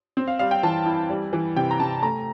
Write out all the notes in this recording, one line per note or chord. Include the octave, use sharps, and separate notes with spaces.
C4
F5
G3 F5
G5
E3 A5
E4
G3
E3
C3 G5
A#5
C3 A5
A3 A#5